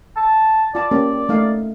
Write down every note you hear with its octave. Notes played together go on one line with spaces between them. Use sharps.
A5
F4 D5 A5
A#3 C#4 G4
A3 D#4 F5